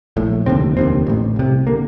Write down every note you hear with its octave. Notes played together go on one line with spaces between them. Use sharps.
A#1 A2
F1 D#2 D3 C4
F1 D#2 D3 C4
A1 A2
C2 C3
D3 A#3